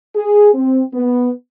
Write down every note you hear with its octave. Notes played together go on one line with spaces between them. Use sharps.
G#4
C4
B3